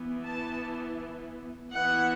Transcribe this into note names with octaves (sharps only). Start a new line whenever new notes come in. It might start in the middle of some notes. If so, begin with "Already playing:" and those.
Already playing: E3 B3 E4
A5
E3 B3 E4 F#5